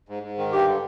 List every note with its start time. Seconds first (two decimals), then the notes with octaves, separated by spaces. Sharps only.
0.09 G#2
0.23 G#2
0.38 D#3
0.52 G2 G4
0.67 D3